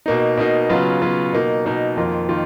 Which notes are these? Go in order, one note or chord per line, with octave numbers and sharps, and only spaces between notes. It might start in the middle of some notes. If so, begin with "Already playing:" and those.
B2 A#3 D#4
B2 A#3 D#4
C#3 F#3 B3 F4
C#3 F#3 B3 F4
B2 A#3 D#4
B2 A#3 D#4
F2 D#3 A#3 F4
D#3 A#3 F4